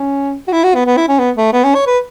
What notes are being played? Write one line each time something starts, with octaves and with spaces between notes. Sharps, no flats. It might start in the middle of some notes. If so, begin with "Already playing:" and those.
Already playing: C#4
F#4
E4
F#4
B3
B3
E4
C#4
B3
A3
B3
C#4
C#5
B4